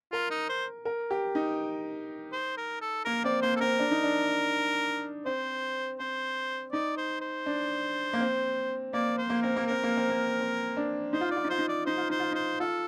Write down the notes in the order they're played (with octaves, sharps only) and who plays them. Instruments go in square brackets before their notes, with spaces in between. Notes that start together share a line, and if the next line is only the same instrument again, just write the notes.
[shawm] F4 [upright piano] A#4
[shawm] D#4
C5
[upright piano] A#4
G4
D#4
[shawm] C5
A#4
A4
[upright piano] A#3 [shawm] A#4
[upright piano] C4 [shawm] D5
[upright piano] A#3 [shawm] C5
[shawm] A4
[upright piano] C4 [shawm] A#4
[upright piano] D4
D#4
D4
[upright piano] C4 [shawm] C5
[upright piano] C4 [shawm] C5
[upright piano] D#4 [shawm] D5
[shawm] C5
C5
[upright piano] D4
A#3
C4
[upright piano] A#3 [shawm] D5
[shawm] C5
[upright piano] A#3
[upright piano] C4 [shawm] A#4
[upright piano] A#3
[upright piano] C4 [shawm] A#4
[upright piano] A#3
C4
A#3
C4
D4
[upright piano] D#4 [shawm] C5
[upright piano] F4
D#4
[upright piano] F4 [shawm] D5
[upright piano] D#4
[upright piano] F4 [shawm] C5
[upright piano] D#4
[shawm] D5
[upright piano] D#4 [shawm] C5
[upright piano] F4
[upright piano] D#4 [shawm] C5
[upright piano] F4
[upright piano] D#4 [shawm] C5
[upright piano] F4 [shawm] A4